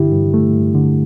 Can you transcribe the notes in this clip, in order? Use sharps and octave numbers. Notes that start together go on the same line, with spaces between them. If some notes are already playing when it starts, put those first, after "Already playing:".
Already playing: G2 D3 E4 G4
G2
A3
G2
D3